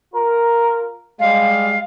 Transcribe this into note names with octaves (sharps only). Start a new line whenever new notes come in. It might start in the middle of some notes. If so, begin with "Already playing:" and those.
F4 A#4
G3 G#3 F5